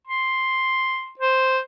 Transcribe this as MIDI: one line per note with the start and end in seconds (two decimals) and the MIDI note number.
0.07 1.11 84
1.19 1.59 72